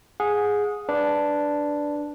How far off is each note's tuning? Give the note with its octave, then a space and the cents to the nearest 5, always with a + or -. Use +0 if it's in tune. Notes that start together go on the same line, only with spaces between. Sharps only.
G#4 +0 F#5 -35
D4 +0 B4 +0